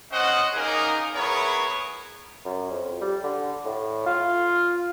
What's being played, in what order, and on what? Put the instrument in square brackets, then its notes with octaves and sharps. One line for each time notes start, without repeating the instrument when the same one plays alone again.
[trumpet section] C#4 C5 D#5 F#5
A#3 C#4 D#4 G#4 A#4
B3 E4 G#4 A#4 C#5
[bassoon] F#2
F2
G3
D3
A2
F4